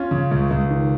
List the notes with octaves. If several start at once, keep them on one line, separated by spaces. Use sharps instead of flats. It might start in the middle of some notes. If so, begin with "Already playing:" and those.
Already playing: C#4 F4
C#3
C#2
C#2
D#3